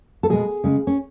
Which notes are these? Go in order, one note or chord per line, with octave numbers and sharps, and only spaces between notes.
A4
B2 G#3 G#4
C#3 G#3
C#4